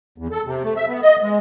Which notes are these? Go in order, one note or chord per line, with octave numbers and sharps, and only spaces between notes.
E2
A4
C3
A3
E5
B3
D#5
G#3